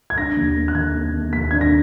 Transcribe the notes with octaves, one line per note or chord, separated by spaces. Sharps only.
G#6
D4 A#6
D#2
A#3
F#6
D#3 G#6
A#3
A#3
D#2 B6
D4 G#6
A#6